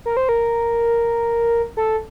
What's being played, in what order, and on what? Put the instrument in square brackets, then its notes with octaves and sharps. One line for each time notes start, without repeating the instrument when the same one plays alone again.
[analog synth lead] A#4
C5
A#4
A4